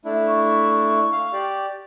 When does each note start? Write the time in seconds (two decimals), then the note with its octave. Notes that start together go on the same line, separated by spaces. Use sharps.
0.05 A3 D4 E4
0.28 C#6
1.12 F5
1.33 G4 D5